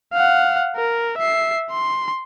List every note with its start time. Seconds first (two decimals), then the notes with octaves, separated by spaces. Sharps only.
0.13 F5 F#5
0.76 A#4
1.18 E5 C7
1.71 C6